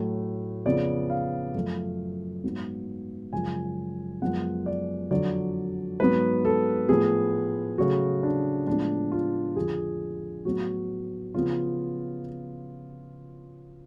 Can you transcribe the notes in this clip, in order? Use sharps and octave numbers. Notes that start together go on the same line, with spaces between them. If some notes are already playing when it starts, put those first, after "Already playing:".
Already playing: A2 F#3 A3
F2 C#3 F3 B3 D5
F5
F#2 F3 A3
G#2 F#3 B3
F#2 C#3 F3 G#3 G#5
F#2 F3 G#3 B3 F#5
D5
F2 D3 F#3 D5
G#2 F#3 B3 B4
A4
A2 F3 B3 G#4
C#3 F#3 A3 F#4
D4
A2 F3 G#3 B3 D4
F4
F2 D3 F3 G#4
A2 F#3 B3 F#4
C#3 F3 B3 F4